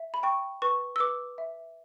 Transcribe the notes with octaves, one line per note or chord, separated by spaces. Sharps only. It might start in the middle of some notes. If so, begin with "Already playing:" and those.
Already playing: E5
B5
G5 C#6
B4 C#6
E6
B4 D6
E5